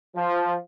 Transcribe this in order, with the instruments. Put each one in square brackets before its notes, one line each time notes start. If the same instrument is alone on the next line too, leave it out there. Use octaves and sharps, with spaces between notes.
[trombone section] F3